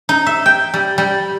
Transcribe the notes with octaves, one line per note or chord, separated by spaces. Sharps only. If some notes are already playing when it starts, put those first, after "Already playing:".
D#4
E5
G5
G3
G3